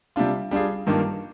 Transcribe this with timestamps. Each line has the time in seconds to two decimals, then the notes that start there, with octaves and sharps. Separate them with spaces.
0.16 C3 G3 D4 F4
0.51 G3 D4 F4 G#4
0.87 G2 D#3 A#3 D4 F4